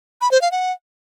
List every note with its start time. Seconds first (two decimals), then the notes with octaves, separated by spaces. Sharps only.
0.21 B5
0.31 C5
0.42 F5
0.52 F#5